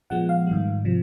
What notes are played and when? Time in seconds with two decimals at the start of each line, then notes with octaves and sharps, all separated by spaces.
0.10 A#2 F3 G#3 B3 F#5
0.29 F5
0.47 G#2 D#3 G3
0.85 C3 F3